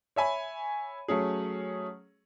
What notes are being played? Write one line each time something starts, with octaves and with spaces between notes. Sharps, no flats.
C#5 E5 G#5 B5
F#3 A3 C#4 G#4